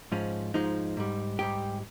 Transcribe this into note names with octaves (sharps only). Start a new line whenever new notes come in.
G#2 F3 G#3 C#4
G#2 F3 G#3 D#4
G#2 G3
G#2 G3 G4